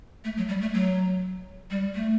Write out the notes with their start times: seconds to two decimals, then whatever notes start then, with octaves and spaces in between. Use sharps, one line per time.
0.24 A3
0.37 F#3
0.48 G3
0.61 A3
0.74 F#3
1.71 G3
1.95 A3